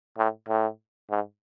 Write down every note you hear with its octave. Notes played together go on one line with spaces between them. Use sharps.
A2
A2
G#2